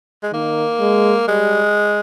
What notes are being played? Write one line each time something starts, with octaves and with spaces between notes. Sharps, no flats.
G#3
D#3 A#3
G#3
G3 G#3